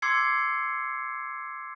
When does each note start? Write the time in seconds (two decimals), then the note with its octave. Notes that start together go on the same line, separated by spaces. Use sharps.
0.02 C6 D6 E6 G#6 C7 C#7